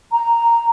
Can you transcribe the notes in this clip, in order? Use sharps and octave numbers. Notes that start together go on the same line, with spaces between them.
A#5